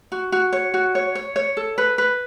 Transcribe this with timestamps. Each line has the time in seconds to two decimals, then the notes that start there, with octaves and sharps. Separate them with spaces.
0.12 F#4
0.32 F#4
0.53 C#5
0.74 F#4
0.95 C#5
1.15 C#5
1.36 C#5
1.57 A4
1.78 B4
1.98 B4